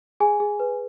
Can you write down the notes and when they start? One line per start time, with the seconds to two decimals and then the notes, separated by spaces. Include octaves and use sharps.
0.20 G#4 G#5
0.40 G#4
0.60 B4